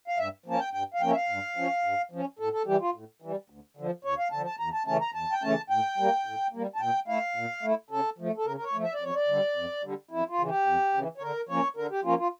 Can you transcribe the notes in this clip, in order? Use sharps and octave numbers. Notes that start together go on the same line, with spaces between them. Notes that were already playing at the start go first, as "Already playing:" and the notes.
F5
G2 E5
F3 A#3 C#4 A5
G5
G2 G5
F5
F3 A#3 C#4 G5
E5
F5
G2
F3 C#4
G2
F3 C#4
A2 A4
A4
E3 G3 G4
F4
A2
E3 G3
D2
D3 F3
D2 C#5
F5
D3 F3 A5
A5
E2 A#5
A5
C#3 E3 A3 C#4 A5
A#5
E2 A5
G5
C#3 E3 A3 C#4 A5
A2 G5
G3 A#3
A2
G3 A#3
A5
A#2 G5
A3 E4 F5
A#2
A3 E4
C#3 A4
F3 A3
A4
C#3 A#4
A#4
C#5
F3 A3
E5
D5
F2 C#5
D5
D3 G3
F2
D3 G3
F2 E4
F4
C#3 E3
G4
F2
C#3 E3
C#5
D3 A#4
F3 A#3 C#4 C#5
D3 A#4
G4
F3 A#3 C#4 F4
F4